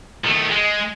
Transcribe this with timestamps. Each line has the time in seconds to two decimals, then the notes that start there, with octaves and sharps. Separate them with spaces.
0.24 D#3 A3
0.50 G#3